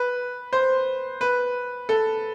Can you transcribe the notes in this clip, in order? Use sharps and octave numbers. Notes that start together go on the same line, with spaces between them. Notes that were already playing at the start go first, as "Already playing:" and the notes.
Already playing: B4
C5
B4
A4